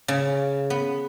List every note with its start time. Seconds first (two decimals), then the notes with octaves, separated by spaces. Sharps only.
0.08 C#3
0.70 B3